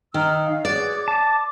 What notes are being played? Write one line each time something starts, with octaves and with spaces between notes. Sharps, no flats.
D#3 A#5 E6 F6
D#5 F5
F#4 G#4 C#5 D5
D6
A5